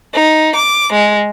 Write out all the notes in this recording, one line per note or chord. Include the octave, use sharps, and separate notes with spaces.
D#4
D6
G#3